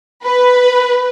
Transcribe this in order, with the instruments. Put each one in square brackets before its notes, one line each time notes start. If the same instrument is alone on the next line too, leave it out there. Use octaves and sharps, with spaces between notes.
[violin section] B4